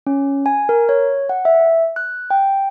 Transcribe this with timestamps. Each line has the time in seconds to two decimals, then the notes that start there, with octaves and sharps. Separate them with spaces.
0.07 C#4
0.46 G#5
0.69 A#4
0.89 C#5
1.29 F#5
1.45 E5
1.96 F#6
2.30 G5